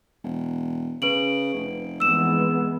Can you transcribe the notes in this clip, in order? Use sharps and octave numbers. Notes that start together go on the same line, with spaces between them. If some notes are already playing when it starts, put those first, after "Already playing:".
E1
C#3 B4 D7 F#7
F1
E3 G#3 B3 E6 E7